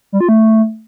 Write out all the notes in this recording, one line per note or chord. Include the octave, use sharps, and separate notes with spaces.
G3
F4
A3